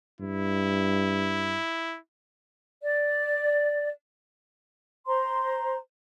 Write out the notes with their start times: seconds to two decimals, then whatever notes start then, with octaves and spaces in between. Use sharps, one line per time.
0.20 G2 E4
2.84 D5
5.07 C5 A#5 C6